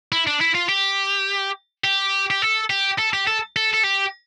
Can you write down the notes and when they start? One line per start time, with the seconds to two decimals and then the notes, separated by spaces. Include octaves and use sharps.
0.12 E4
0.27 D4
0.41 E4
0.55 F4
0.69 G4
1.84 G4
2.30 G4
2.42 A4
2.70 G4
2.98 A4
3.13 G4
3.27 A4
3.56 A4
3.74 A4
3.84 G4